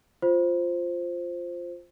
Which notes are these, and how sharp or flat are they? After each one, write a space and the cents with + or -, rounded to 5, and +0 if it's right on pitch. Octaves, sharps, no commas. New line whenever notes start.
F4 +0 C5 +0